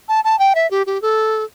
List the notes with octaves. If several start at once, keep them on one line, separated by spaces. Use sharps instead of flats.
A5
A5
G5
E5
G4
G4
A4